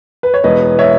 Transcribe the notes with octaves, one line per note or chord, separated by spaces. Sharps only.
B4
C#5
E1 B4 D#5
C#5 E5